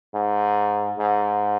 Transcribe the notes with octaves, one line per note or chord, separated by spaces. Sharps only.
G#2
G#2